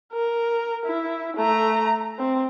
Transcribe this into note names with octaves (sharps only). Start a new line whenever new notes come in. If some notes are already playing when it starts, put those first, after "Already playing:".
A#4
E4
A3 A#5
C4